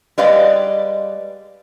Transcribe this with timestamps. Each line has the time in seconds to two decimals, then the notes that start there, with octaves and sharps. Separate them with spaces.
0.18 G3 G#3 B4 D5 D#5 F5